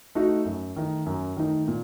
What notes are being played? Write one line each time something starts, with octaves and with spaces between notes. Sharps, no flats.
A3 D#4 F#4
F#2
D#3 A3 D#4
F#2
D#3 A3 D#4
A#2